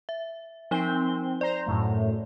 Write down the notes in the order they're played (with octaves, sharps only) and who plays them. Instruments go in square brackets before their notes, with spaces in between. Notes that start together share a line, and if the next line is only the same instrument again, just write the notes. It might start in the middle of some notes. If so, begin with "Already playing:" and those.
[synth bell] E5
[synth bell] F3 D#4 G7 [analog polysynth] C4
[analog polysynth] C5 A#5 [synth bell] D5
[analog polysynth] F#2 A2 A3